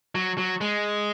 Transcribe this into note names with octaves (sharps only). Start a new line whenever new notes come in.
F#3
F#3
G#3